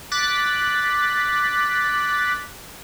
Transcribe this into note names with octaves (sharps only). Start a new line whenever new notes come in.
D6 F#6 A6 B6